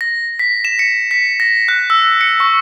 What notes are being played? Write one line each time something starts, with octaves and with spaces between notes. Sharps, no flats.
A#6
B6
E7
C#7
B6
A#6
F#6
E6
C#7
C#6